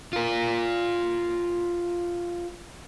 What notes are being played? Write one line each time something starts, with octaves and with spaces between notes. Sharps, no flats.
F4 A#4